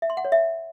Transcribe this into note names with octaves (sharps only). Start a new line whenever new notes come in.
E5
C6
F#5
C#5
E5